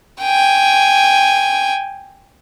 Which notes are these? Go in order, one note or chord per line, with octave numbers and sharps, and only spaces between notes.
G5 G#5